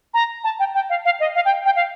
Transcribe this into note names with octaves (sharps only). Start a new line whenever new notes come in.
A#5
A5
G5
G5
F5
F5
D#5
F5
G5
G5
F5